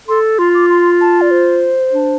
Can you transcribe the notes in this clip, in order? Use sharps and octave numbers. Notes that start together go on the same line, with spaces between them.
A4 C6
F4 C6
D6
C6
A5
D5
C5
D4